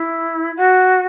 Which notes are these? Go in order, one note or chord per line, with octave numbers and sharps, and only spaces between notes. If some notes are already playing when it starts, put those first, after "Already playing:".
Already playing: E4
F#4